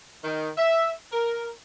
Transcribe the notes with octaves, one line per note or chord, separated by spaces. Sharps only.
D#3
E5
A#4